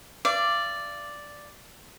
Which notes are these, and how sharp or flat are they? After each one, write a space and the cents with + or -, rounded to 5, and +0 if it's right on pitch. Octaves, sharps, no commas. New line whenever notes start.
D5 +0 F5 -40